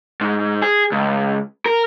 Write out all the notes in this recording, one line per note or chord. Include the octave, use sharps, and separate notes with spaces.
G#2
G#4
C#2
A#4